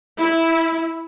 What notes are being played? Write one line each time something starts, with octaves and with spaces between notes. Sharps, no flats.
E4